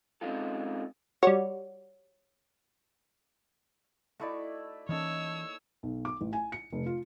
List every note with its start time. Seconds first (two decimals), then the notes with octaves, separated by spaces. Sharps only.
0.21 G#3 C4 C#4 D#4 F4 A4
1.23 G3 F#4 C#5
4.20 A3 D#4 E4 F#4 D5
4.89 E3 A#3 C#4 D#4 A4 C#5 E6
5.83 B1
6.05 D6
6.21 A1
6.33 G#5
6.52 C#7
6.73 F1
6.86 F4